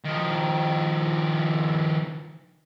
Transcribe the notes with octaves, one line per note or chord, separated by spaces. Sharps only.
D#3 F3